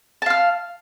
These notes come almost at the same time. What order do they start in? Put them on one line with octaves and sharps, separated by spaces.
A5 F5 F6